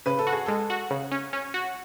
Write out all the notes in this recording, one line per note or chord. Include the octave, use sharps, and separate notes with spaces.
C#3 B4
A4
F#4
G#4
G#3 A4
F#4
C#3
C#4
C#4
F#4